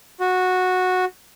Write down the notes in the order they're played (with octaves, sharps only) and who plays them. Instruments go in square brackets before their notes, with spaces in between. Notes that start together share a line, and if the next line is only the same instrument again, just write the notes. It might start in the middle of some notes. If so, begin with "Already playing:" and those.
[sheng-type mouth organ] F#4